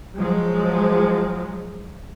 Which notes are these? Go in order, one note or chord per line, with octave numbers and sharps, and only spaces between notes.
F3 F#3 G#3